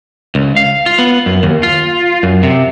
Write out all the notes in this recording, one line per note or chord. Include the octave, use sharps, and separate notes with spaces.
C#2
F5
F4
B3
F#2
D#2
F4
F#2
C3